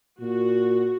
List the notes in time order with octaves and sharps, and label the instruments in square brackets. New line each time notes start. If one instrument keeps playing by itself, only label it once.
[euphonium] A#2 [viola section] F#4